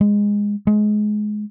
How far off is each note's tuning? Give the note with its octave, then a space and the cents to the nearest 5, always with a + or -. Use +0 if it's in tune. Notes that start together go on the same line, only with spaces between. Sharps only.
G#3 -15
G#3 +20